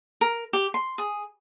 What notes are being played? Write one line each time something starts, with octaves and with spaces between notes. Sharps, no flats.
A#4
G4
C6
G#4